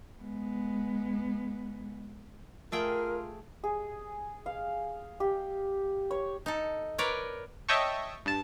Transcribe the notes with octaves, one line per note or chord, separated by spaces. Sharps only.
G#3 B3
A3 F4 G#4 A#4 G5
G#4
F5
G4
C#5
D#4 A4
A#4 B4 C#5 D5
C#5 D#5 E5 G5 A5 C#6
G2 A5